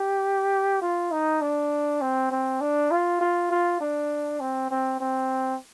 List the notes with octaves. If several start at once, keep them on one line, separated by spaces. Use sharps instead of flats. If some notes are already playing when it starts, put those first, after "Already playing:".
Already playing: G4
F4
D#4
D4
C4
C4
D4
F4
F4
F4
D4
C4
C4
C4